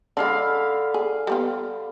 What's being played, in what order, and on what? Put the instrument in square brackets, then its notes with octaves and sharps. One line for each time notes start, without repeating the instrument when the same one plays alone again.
[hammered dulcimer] D3 F5 B5 [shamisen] G#3 D4
[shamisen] G#4
G3 B3 F4